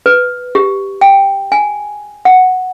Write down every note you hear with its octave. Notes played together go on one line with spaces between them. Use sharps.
B4
G4
G5
G#5
F#5